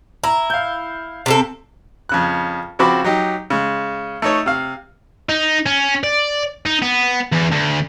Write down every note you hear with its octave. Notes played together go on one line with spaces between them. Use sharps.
E4 A#5
F5 G6
C3 C4 A4
F2 C#3 F#6
C#3 F3 C4 F#4 B5 D6
F#3 D#4 G4
C#3 G#3
A3 D#4 C#5
C3 F5
D#4
C#4
D5
D#4
B3
E2
D2